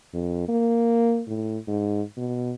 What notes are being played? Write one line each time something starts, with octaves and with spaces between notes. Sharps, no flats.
F2
A#3
A2
G#2
B2